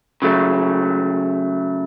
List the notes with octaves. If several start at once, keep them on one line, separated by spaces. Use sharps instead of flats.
C#3 F#3 A3